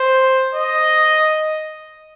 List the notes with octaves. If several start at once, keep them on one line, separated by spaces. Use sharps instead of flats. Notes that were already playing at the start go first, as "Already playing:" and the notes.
Already playing: C5
D#5